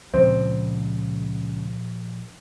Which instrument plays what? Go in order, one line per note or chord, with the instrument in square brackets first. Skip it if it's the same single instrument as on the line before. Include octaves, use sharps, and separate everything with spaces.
[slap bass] C#2 [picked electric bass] A#2 F3 [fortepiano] C4